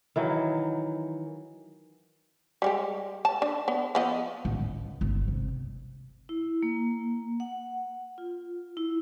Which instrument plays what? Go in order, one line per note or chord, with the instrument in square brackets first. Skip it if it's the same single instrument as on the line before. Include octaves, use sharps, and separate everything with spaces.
[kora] D#3 E3 F#3
[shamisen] G3 G#3 G4
A5
D4
B3
F3 B3 D#5
[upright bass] A1
C#2
G1
C2
[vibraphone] E4
A#3
F#5
F4
E4